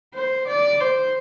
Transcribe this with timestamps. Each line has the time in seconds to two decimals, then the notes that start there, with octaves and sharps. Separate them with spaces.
0.14 C5
0.47 D5
0.81 C5